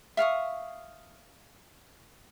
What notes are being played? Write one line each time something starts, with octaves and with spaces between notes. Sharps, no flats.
E5 F5 C#6 D#6